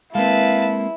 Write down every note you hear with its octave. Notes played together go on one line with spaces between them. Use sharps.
G#3 A#3 C4 E4 B4 F5 A5